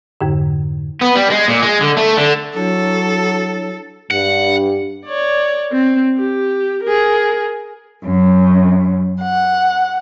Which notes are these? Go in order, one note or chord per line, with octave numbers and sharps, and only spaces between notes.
F2 G#2 D3
B3
G3
G#3
A#2
G#3
D3
A3
D3
F#3 D4 E4 A4 C#5
G2 F#5
C#5 D5
C4
G4
G#4 A#4
F#2
F#5